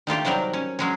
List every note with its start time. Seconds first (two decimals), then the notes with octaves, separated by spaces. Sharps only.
0.07 D#3 A3 F4 G4
0.25 C3 D#3 F#3 G3 A#4
0.53 C#4
0.79 F#3 G#3 C#4